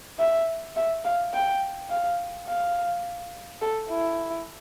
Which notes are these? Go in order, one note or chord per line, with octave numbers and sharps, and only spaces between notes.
E5
E5
F5
G5
F5
F5
A4
E4